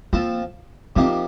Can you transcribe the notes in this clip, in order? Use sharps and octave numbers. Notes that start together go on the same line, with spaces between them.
F3 A#3 C4 F4 A4
C3 F3 A#3 C4 D#4 G4